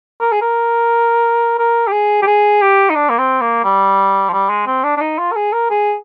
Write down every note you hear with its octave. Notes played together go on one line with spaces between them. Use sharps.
A#4
G#4
A#4
A#4
G4
G#4
G4
G#4
G4
D#4
D4
A#3
C4
A#3
G3
F3
G3
G#3
C4
D4
D4
D#4
F4
A#4
G#4
A#4
G#4